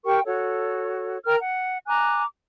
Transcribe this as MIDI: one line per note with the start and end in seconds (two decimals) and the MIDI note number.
0.05 0.19 67
0.05 0.19 70
0.05 0.19 79
0.05 0.19 85
0.26 1.18 66
0.26 1.18 69
0.26 1.18 73
1.25 1.35 70
1.25 1.35 79
1.25 1.35 82
1.25 1.35 89
1.39 1.78 78
1.87 2.23 80
1.87 2.23 82
1.87 2.23 86
1.87 2.23 90